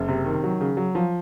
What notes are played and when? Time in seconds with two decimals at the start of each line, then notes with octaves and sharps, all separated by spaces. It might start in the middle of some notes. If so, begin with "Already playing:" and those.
Already playing: F#1
0.08 C3
0.26 D#3
0.44 F#3
0.61 C#3
0.77 F#3
0.95 F3